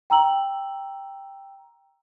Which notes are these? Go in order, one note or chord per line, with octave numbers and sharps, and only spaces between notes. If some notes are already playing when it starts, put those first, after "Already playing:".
G5 A#5 E6 F#7